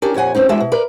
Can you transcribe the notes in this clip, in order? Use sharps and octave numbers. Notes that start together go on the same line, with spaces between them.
C#4 D4 G4 A#4
F2 A#2 C#5 F#5 G#5
G2 C4 C#4 D#4
E2 G#3 D4 E4 F#4 E5
B2
A#4 B4 D5